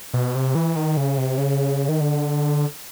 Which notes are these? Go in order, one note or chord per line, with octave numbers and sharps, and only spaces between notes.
B2
C3
E3
D#3
C#3
C3
C#3
D#3
D3